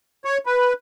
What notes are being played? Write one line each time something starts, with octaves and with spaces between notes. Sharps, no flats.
C#5
B4